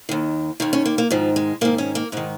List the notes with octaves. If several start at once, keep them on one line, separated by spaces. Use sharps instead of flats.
D#2 D#3
D#2 D#3 A#3
C#4
A#3
A#3
G#2 D#3 F3
G#3
G#2 D#3 A#3
C#4
A#3
G#2 D#3 G#3